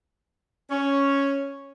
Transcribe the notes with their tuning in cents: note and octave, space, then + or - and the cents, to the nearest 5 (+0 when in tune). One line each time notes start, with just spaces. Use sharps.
C#4 +0 C#5 +0